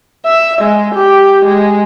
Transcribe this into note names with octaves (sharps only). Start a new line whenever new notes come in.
E5
G#3
G4
G#3